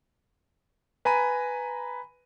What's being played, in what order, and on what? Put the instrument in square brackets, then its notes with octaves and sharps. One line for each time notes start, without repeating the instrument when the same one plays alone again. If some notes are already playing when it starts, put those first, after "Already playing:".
[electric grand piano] B4 G#5 A#5 B5 D#7